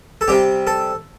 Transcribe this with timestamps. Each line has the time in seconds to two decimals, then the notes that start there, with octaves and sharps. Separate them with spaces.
0.21 A4
0.28 C3 G3 C4 G4
0.67 A4